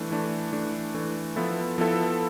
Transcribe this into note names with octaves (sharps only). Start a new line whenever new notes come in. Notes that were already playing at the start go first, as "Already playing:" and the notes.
Already playing: E3 A3 D4
E3 A3 D4
E3 A3 D4
E3 A3 D4
F3 B3 E4 A4
F3 B3 E4 A4